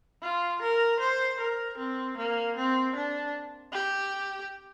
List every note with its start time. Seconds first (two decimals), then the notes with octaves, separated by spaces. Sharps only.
0.22 F4
0.62 A#4
1.00 C5
1.40 A#4
1.77 C4
2.17 A#3
2.56 C4
2.95 D4
3.72 G4